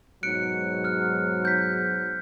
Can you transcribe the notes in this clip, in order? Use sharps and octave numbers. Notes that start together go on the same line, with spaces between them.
G#2 B2 F#3 F#6 C#7 D7
F6 F#6
G6 B6